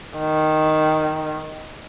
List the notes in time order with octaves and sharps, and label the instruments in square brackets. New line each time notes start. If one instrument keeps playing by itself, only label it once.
[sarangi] D#3